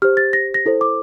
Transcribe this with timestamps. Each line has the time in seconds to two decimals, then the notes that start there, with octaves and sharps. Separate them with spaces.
0.02 G4 C5 F6
0.17 A6
0.33 A#6
0.54 A#6
0.66 E4 A4 C5
0.81 D6